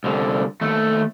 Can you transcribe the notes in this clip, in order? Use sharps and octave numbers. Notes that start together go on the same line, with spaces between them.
C2 D3
D#2 A3